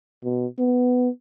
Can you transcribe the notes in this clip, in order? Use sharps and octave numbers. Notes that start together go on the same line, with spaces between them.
B2
B3